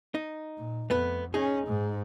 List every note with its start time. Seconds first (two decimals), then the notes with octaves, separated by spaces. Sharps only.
0.15 D#4
0.58 A#2
0.90 F2 A3 B3 B4
1.34 C#4 D#4 G#4
1.67 G#2